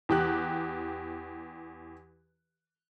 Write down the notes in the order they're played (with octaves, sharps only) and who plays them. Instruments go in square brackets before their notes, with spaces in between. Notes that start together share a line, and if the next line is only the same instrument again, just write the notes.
[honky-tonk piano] E2 G4 F#6